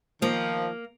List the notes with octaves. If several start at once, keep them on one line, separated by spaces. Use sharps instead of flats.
D#3 F3 A#3